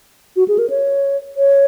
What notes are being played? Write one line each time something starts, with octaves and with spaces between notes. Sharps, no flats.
F#4
G#4
A#4
C#5
C#5